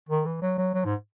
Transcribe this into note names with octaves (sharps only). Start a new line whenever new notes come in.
D#3
E3
F#3
F#3
F#3
G#2